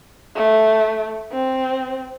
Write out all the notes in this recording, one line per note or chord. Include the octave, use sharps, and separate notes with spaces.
A3
C4